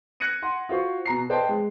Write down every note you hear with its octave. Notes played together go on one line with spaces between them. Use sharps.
F#6 G#6 A#6 C#7 D#7
F#5 C6
F4 F#4 C5 C#6
B2 A#5 C7
B4 C5 D5 D#5 G5 A5
G#3